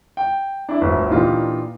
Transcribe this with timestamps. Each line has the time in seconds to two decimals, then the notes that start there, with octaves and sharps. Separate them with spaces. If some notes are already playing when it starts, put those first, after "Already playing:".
0.17 G5
0.69 D4 E4
0.81 G1 D2
1.10 A#2 E3 D4 D#4 F4 G4